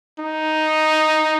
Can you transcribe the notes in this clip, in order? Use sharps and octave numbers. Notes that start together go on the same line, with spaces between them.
D#4